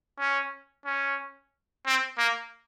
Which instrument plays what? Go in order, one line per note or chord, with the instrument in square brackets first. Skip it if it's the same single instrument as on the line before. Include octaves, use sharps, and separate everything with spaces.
[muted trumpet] C#4
C#4
C4
A#3